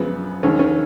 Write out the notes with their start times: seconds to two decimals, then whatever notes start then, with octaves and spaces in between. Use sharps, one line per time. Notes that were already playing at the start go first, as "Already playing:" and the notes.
Already playing: F#2 C#3 F3 G#3 B3
0.43 D#2 D#3 G#3 C#4
0.59 C#4